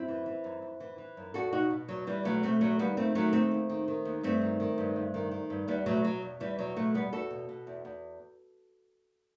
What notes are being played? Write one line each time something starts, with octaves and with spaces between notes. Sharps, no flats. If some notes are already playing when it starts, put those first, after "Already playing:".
Already playing: F#2 C4 E4
E3
E3
F#2
F#2
E3
E3
F#2
E2 F#4 A4
B2 D#4 F#4
B2
E2 F#3
E2 E3 G3
B2 F#3 A3
B2 A3 C4
E2 F#3 A3
D#2 G3 B3
D#3 A3 C4
D#3 F#3 A3
D#2 A3 C4
D#2
D#3
D#3
D#2
G2 A3 C4
D#3
D#3
G2
G2
D#3
D#3
G2
E2 G3 B3
B2 F#3 A3
B2 F#3
E2
E2 E3 G3
B2 F#3
B2 F#3 A3
E2 G3 B3
E2 F#4 A4
B2
B2
E2
E2